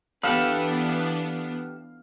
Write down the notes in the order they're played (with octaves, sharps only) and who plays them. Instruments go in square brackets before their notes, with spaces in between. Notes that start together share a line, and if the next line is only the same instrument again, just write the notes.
[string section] E3 B3 D4 [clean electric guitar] G4 A4 B4 [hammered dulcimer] F5